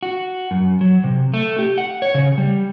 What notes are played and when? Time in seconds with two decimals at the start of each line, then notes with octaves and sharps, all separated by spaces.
0.03 F#4
0.51 F#2
0.81 F#3
1.04 C3
1.34 A3
1.59 G4
1.78 F#5
2.02 C#5
2.15 C#3
2.38 G3